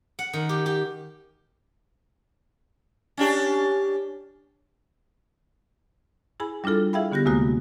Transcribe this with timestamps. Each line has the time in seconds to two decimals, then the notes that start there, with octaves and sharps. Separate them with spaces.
0.19 F#5
0.33 D#3
0.49 G4
0.66 G4
3.17 C#4 D4 G4
6.40 E4 G#4 G#5 B5
6.64 G3 D4 E4 F4 A4
6.93 E4 G#4 E5 F5 G5 B5
7.12 D3 B3 G4 F#6 A#6
7.25 D2 C3 G#3 A#3 F#4 D#6